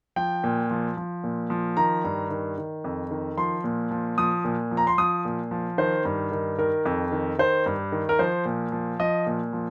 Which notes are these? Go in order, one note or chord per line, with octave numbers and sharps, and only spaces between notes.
F3 G5
A#2
F3
F3
A#2
F3
D#3 A#5
G2
D#3
D#3
F2
D#3
F3 C6
A#2
F3
F3 D#6
A#2
F3
A#5
C6
F3 D#6
A#2
F3
D#3 C5
G2
D#3
D#3 A#4
F2
D#3
D#3 C5
G2
D#3
A#4
F3 C5
A#2
F3
F3 D#5
A#2
F3